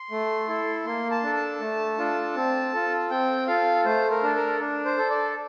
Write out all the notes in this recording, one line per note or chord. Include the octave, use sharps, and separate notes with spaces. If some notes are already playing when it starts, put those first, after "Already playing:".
Already playing: C6
A3
E4 A4
A#3 C6
A5
D4 A4
A5
A3
D4 F4 A4
C4
F4 A4
C4 G5
F4 A4 F5
A3 C5
A#4
D4 A4
A#4
D4
C5
A4
D5